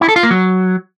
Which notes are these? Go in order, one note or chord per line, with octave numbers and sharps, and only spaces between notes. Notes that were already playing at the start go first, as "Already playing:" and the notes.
E4
A4
F4
A#3
F#3